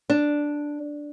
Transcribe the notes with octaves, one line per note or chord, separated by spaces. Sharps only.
D4